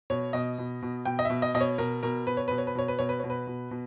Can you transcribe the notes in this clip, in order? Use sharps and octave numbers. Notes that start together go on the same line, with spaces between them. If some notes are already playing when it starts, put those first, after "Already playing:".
B2 C#5
B2 D#5
B2
B2
B2 G5
D#5
B2 E5
D#5
B2 D#5
C#5
B2 A#4
B2 A#4
B2 B4
C#5
B2 B4
C#5
B4
B2 C#5
B4
B2 C#5
B4
B2 C#5
B4
B2
B2